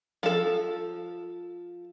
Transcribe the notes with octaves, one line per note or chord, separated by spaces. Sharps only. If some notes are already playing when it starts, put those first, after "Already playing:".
F3 A4